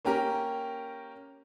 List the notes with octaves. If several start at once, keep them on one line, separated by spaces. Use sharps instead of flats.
A#3 C#4 G4 A#4